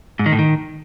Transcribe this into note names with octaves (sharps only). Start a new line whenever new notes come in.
G#2
D#3
A2
D#3